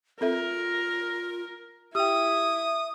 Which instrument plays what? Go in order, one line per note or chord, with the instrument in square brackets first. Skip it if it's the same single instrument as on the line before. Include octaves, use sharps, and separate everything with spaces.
[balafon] C4 A4 E5 [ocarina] F4 [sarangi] A#4
[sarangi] E4 [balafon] G4 G5 [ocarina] E5 [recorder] D#6